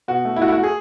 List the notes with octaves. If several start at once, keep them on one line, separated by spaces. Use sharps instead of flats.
B2 F#4
A3
E4
A3 F#4
E4
F#4
A3
G#4